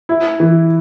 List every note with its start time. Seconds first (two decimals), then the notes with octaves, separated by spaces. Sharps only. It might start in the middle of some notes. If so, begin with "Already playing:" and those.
0.09 E4
0.40 E3